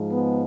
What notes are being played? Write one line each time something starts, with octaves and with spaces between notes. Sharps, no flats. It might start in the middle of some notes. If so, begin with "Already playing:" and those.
Already playing: G#2 F3 G#3
B3